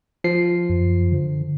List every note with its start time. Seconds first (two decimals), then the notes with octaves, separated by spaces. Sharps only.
0.24 F3 C7
0.69 F#2
1.12 D3